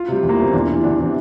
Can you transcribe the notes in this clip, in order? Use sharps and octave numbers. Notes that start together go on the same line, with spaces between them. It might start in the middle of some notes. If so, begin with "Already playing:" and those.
Already playing: F4
C3 G3
E2
A#3
C3 G3 C4
E2 D4
C3
E3
E2 D4
C3 E3